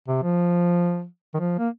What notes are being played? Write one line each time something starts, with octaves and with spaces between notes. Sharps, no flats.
C3
F3
D#3
F3
A#3